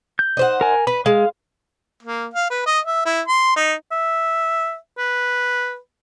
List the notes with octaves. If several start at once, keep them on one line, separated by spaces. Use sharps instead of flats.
G6
D#4 C5 F#5
A#4 G#5
B4 B5
G#3 F5
A#3
F5
B4
D#5
E5
E4
C6
D#4
E5
B4